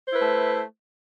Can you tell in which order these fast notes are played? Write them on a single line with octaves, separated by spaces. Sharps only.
C5 E4 B4 A3